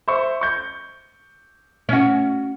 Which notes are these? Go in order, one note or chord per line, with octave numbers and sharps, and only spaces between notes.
C5 E5 C#6
C#6 G6
C#4 F#4